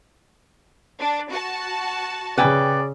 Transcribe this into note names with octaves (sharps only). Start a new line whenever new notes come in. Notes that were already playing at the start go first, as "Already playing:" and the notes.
D4
F#4 A5
C#3 B4 D5 G5 G#5